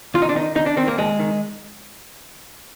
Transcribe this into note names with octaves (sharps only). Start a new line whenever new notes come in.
D#2 F4
D#4
D4
D#3 D#4
D#2 D#4
D4
D#3 C4
A#3
D#2 G#3
D#3